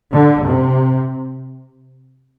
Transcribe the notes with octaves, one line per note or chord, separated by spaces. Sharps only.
D3
C3